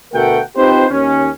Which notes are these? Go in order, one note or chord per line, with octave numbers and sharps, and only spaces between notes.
D2 B2 A3 A#4 F#5 G5
C4 D#4 F4 G4 B4 C5
D#2 C#4